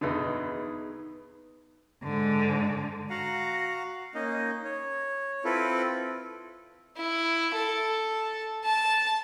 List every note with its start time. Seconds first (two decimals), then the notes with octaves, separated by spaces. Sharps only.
0.01 E2 B2 D3 B3 D#4 G#4
2.03 G#2 D3
3.10 F#4 F5 F#5 A#5
4.15 A#3 C#4 D#4 D#5
4.65 C#5
5.45 C4 E4 F4 A4 B4
6.97 E4
7.55 A4
8.64 A5